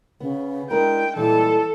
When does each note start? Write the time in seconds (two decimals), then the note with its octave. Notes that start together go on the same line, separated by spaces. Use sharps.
0.20 C#3 B3
0.71 G#3 D4 E4 A#4 G5
1.16 A#2 E3 G3 G#3 A4